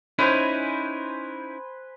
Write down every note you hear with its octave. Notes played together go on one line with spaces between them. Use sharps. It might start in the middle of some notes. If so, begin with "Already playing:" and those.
C#4 D#4 E4 B4 C5 G#5